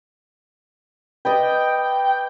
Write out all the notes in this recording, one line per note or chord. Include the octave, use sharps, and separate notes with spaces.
B4 D5 D#5 G5